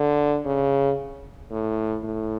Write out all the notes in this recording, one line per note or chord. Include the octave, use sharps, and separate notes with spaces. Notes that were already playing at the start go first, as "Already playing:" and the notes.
Already playing: D3
C#3
A2
A2